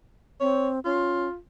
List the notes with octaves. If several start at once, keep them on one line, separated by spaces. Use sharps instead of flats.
C4 C#5
C#4 F4